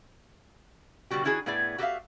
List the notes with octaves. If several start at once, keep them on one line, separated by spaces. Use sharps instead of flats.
B2 D3 G3 F#4 G4
D#3 D4 E4 F#4 G#4
A2 B3 E4 G#4 D5
F#4 G4 A4 A#4 E5 F5